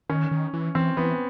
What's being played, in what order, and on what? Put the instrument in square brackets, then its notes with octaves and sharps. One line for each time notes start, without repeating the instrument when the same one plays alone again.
[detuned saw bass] D#3 [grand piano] C#4
[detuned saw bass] D#3
E3
[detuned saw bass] E3 [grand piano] C4
[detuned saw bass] E3 [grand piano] B3